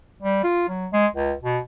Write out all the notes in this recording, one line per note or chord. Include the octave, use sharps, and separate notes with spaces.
G3
F4
F#3
G#3
C#2
B2